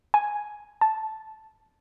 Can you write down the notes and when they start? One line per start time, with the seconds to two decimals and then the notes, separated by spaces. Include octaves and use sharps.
0.14 G#5
0.81 A5